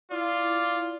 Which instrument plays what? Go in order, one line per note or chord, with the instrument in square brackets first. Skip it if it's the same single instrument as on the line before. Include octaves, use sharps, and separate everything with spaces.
[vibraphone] E4 [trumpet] F4 [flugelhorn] D5